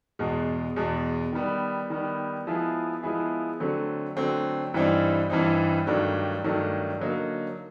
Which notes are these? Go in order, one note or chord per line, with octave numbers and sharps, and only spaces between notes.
E2 B2 G#3
E2 B2 G#3
D#3 G3 B3
D#3 G3 B3
F3 G#3 B3 E4 G#4
F3 G#3 B3 E4 G#4
D3 F#3 A3 C4
D3 F#3 A3 C4
G2 E3 G3 C4 D#4
G2 E3 G3 C4 D#4
G2 D#3 F#3 A3 D4
G2 D#3 F#3 A3 D4
D3 F#3 A#3 D#4